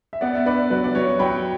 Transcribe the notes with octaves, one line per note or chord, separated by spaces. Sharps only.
E5
B3 D5 F#5
E5
D4 B4 D5
F#3 B4
D5
F#3 C#5
F#3 G5 B5